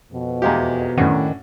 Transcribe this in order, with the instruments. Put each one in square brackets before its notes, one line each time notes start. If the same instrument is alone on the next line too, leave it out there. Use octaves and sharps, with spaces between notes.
[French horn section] F2 B2
[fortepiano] E2 G#3 G4 [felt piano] F5 A#5
[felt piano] F#2 A2 [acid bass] D#3 [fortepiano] C#4 D4 F#4